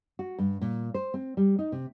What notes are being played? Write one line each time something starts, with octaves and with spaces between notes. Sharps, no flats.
F#4
G2
A#2
C5
C4
G3
D#4
C3